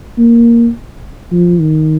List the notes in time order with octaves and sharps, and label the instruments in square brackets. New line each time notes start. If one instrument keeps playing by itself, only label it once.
[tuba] A#3
F3
D#3